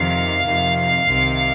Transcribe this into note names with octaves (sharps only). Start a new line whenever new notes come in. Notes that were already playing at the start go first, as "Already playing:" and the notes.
Already playing: F2 C3 D#3 F5
F2 C3 D#3
C2 C3 D#3